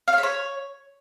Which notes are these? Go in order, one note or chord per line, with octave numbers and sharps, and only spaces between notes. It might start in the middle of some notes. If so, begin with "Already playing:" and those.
F5
C#5
E5
C#5